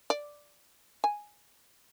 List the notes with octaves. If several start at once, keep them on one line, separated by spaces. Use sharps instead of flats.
D5
G#5